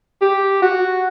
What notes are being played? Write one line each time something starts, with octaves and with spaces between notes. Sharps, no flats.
G4
F#4